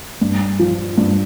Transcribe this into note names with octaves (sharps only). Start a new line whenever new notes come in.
G2
F3
G2